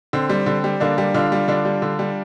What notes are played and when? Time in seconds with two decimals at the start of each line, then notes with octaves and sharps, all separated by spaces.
0.13 D3 C4
0.29 G3
0.46 D3
0.64 G3
0.80 D3 A#3 D4
0.98 G3
1.14 D3 D4 F4
1.32 G3
1.48 D3 D4 F4
1.65 G3
1.82 D3
1.99 G3